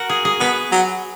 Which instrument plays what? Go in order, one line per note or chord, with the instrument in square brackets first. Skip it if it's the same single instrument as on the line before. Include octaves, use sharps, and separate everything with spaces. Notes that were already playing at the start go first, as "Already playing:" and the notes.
Already playing: [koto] F#4 A#4
G#4
G#4
[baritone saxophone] B3 [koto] B4
[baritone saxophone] F#3